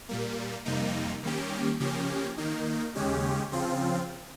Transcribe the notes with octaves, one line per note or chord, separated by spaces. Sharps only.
A#2 G3 A#3
F2 C3 G3 A#3 D#4
D#3 G3 A#3 C#4 G4
C#3 F3 A#3 C#4 G4
D#3 A#3 D#4
D#2 C#3 G#3 C#4 G4
C#3 F3 C4 F4